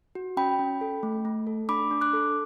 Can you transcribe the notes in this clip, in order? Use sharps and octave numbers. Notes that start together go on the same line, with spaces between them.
F#4
C#4 G5 B5
C#4
A4
A3
A3
A4
D4 B5 D6
D4
D6 F#6
A4